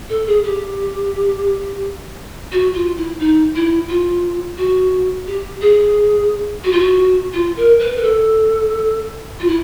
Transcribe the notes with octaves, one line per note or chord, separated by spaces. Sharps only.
A4
G#4
G4
F#4
F4
E4
D#4
E4
F4
F#4
G4
G#4
F#4
F4
F#4
F4
A#4
B4
A#4
A4
F4
E4